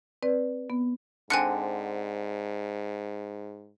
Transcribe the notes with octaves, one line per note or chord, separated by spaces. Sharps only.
C4 B4 D5
B3
G#2 D3 C4 G#5 F#6 C#7